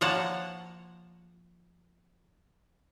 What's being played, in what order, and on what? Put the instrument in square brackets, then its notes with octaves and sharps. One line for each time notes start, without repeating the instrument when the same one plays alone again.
[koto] F3 A#3 C#5 F#5 A5